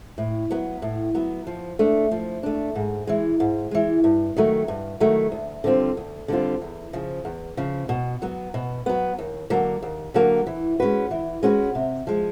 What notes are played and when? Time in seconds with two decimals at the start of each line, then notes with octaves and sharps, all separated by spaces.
0.18 A2
0.51 F#3 B3
0.82 A2
1.14 F#3 B3
1.47 F3
1.79 A3 D4
2.11 F3
2.43 A3 D4
2.75 G#2
3.07 E3 G#3
3.40 G#2
3.71 E3 G#3
4.04 G2
4.36 D#3 F#3 A3
4.68 G2
5.00 D#3 F#3 A3
5.32 D2
5.64 D3 G3 C4 F4
5.97 D2
6.28 D3 G3 C4 F4
6.62 E2
6.93 C#3 F3
7.25 E2
7.57 C#3 F3
7.89 B2
8.22 F#3 B3
8.54 B2
8.86 F#3 B3
9.19 D#2
9.50 D3 F#3 A#3
9.83 D#2
10.14 D3 F#3 A#3
10.47 E3
10.80 G#3 C#4 F#4 B4
11.11 E3
11.43 G#3 C#4 F#4 B4
11.75 C3
12.07 F3 G#3